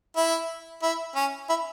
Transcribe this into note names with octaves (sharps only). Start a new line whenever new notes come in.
E4
E4
C#4
E4